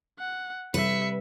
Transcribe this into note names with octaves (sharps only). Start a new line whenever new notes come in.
F#5
C3 G3 B4 E5 C#7